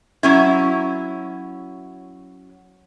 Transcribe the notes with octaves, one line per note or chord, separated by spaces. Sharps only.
F#3 C#4 E4